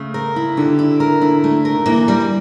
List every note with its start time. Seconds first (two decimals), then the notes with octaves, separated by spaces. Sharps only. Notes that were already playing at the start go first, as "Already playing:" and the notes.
Already playing: C#3 A3
0.14 A#4
0.36 E4
0.57 D3 G4
0.79 E4
1.00 A#4
1.21 D3 E4
1.44 A3
1.65 A#4
1.75 D3
1.86 E3 A#3
2.08 G3